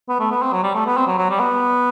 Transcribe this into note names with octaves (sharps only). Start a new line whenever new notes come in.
B3
A3
B3
C4
F#3
G3
A3
B3
C4
F#3
F#3
G3
B3